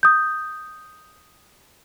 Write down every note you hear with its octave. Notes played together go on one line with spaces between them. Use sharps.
D#6 G6